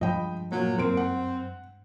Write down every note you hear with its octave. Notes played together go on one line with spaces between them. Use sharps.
G2 F3 G#3 D#5 G5 B5
A#2 F#3
F#2 A#3 C4 D7
F#5